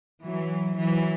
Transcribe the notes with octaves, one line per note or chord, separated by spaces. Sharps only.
E3 F#3
E3 F#3